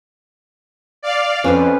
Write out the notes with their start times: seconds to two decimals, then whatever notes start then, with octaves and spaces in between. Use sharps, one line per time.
1.03 D5 F5
1.44 F2 C#4 B4 C5